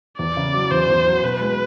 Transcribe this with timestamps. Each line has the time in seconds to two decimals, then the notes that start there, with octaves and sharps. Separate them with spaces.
0.19 E2 D5
0.37 C#3
0.54 F#3
0.71 E2 C5
0.89 E2
1.06 F#3
1.24 B2 B4
1.41 G#3